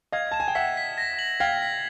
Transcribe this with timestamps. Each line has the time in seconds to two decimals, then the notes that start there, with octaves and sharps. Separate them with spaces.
0.12 D#5 F5 G#6
0.31 A5 E7
0.40 G#5
0.48 G5
0.55 E5 F#5 B6
0.77 B6
0.98 A#6
1.19 F#7
1.40 F5 G5 G#6
1.62 B6